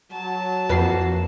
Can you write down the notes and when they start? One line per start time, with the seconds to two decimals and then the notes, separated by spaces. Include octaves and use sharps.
0.11 F#3 A5
0.69 F2 E3 A#3 F#4 B4 C7